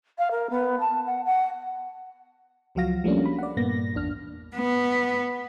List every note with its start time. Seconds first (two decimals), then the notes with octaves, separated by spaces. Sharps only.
0.18 F5
0.31 A#4
0.50 B3
0.80 A5
1.06 F#5
1.25 F#5
2.75 C#2 F3 F#3 F#4 F5 A#6
3.04 F3 G3 A3 A#3 C#4 D4
3.26 B5
3.39 D5 F#5
3.57 G2 A#2 A#3 B3 A#6
3.94 G#1 E2 D4 F6
4.56 B3